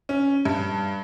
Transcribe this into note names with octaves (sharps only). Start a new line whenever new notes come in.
C#4
G2